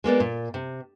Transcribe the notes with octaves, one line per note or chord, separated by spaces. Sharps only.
G#3 A#3 B3 D5
A#2
C3